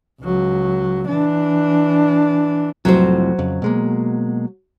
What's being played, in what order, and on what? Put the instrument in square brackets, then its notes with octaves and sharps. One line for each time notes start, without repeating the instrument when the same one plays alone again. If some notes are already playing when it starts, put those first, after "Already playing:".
[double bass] C#2 F#3
E3 D4
[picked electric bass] C2 F2 A2 [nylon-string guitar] F#3 C5
[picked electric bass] F2 C#3
B2 G#3 A#3